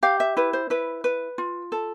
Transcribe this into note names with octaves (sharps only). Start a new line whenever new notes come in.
G4 F5
E5
E4 B4
C5
E4 B4
B4
F4
A4